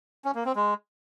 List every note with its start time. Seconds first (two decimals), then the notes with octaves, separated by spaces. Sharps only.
0.25 C#4
0.35 A#3
0.45 C4
0.56 G#3